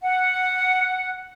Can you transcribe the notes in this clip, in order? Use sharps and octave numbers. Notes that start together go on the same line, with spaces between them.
F#5